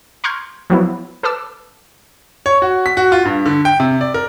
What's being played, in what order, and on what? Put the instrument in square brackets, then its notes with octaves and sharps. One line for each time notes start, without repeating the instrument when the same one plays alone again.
[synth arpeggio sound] A#5 C6 C#6 F6 G6 G#6
F3 F#3 B3 E4
A4 B4 A5 D6 E6
[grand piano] C#5
F#4
B6
F#4
F4
G2
D3
G5
C3
D5
A#4